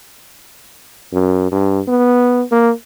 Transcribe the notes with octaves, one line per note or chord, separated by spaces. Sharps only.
F#2
G2
B3
A#3